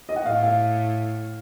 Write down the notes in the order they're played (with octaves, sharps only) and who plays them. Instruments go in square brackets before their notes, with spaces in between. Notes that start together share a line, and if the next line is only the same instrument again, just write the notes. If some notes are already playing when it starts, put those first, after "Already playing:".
[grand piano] D#5
F#5
[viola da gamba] A2 [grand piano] F5
[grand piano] F5